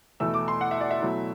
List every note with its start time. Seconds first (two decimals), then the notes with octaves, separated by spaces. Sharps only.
0.20 E2 B2 A3 E4 E6
0.34 D6
0.48 C6
0.61 F#5
0.71 E5
0.81 D5
0.91 E5
1.01 B2 F#3 A3 E4